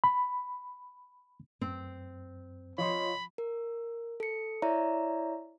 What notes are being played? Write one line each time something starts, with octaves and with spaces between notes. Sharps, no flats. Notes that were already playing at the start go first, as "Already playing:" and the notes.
B5
F#2 C4
F3 F4 C#5 D#5 B5 C6
A#4
A4 C#7
E4 C#5 D5 E5 A#5